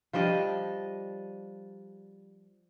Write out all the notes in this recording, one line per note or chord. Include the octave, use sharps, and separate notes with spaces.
F3 G3 D4 D#5